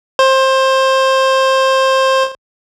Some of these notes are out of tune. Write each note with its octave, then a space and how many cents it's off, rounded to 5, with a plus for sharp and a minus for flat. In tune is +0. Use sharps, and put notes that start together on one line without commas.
C5 +20